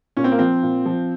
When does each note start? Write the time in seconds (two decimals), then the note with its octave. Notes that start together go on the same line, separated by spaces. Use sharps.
0.17 A#2 C#4
0.24 C4
0.32 A#3
0.39 F3 C4
0.63 A#2
0.86 F3